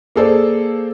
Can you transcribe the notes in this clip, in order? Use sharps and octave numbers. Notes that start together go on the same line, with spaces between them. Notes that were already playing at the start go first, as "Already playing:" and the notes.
A#3 G#4 A4 C5 D5